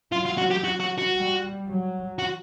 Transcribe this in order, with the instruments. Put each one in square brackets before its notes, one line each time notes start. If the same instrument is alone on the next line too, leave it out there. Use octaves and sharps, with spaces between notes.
[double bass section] F#3 [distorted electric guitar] F4
[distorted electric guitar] F4
F#4
G4
F#4
F#4
F#4
[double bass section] G3
F#3
[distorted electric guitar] F#4